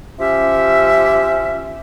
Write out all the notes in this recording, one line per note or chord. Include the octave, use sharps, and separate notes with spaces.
F3 C#4 G4 E5